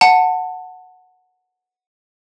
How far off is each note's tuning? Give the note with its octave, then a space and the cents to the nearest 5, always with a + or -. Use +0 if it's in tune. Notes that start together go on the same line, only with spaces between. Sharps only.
F#5 -10 A5 +20